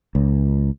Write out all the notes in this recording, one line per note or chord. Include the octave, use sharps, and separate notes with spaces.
C#2